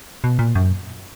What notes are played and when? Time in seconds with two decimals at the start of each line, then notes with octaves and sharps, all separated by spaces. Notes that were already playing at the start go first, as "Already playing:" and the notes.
0.24 B2
0.39 A#2
0.55 F#2